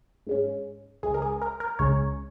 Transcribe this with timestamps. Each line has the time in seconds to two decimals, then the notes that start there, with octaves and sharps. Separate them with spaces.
0.27 G#2 G#3 C#4
1.03 C#2 C#3 G#3 G#4
1.14 A#4
1.22 G#4
1.42 A#4
1.60 A#4
1.79 C#2 C#3 G#3 C#4 C#5